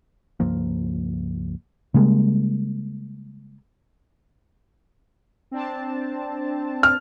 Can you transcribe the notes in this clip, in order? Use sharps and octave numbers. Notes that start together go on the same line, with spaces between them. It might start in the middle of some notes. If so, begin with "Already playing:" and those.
C#2 G2 F3 A#3
C#3 G3 G#3 A#3
C4 D4 A5
F6